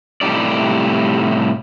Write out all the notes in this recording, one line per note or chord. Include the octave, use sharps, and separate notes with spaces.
A2 C3 F3 G3 D#4 D5